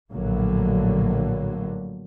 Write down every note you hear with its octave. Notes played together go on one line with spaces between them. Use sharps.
A#1 A2 D3 F#3 A#3